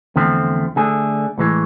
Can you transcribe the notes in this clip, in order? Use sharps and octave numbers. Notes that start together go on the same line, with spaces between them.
E2 D3 F3 A3 C4
D3 A3 D4 G#4
A2 E3 G#3